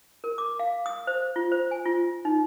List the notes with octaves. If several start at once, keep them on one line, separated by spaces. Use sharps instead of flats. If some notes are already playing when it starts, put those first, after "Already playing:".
A#4
D6
F5
D#6
C5
F4
C5
G#5
F4
D#4